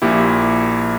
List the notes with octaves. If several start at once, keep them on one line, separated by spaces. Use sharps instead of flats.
A#1 A#2 E4 G4